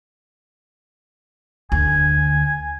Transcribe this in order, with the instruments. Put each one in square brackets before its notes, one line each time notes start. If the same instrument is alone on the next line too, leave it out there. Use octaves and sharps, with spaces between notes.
[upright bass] D2 [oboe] G#5